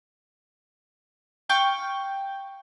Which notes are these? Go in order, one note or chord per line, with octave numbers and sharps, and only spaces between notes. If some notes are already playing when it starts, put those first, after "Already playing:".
F5 G5 C#6